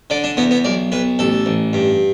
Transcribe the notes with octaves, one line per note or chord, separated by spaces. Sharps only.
D3 D5
D4
E2 B3
B3
B1 D5
B1 B4
A1 A4
A1
G2